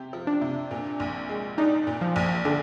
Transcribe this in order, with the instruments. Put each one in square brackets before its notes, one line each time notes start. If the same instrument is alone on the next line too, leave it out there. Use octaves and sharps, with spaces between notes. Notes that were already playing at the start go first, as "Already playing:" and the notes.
Already playing: [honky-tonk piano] C3 G4
F3
[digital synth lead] D4
[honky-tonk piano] C3
A#2
A#1
G#3
[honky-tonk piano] D4 [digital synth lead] D#4
[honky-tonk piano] A#2
[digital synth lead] F3
[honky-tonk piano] A#1
[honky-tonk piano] D3 [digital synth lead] D4